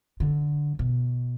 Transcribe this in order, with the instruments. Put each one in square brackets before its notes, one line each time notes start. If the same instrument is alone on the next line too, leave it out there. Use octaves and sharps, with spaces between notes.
[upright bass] D3
B2